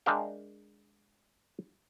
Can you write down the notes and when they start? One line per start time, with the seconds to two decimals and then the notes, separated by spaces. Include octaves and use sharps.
0.06 G#3 D4 A#4 E5 F5 G5